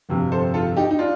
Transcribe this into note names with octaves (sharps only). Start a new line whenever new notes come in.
G1 F2 C3
A4 C5
F4 A4
D#4 G4
D#4
D4 F4